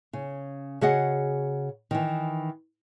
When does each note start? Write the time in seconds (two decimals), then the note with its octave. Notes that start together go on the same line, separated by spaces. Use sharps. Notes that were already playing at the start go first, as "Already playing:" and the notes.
0.13 C#3
0.81 C#3 F#4 G#4 D#5 F#5
1.91 D#3 E3